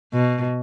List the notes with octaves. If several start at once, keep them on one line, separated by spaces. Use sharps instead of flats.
B2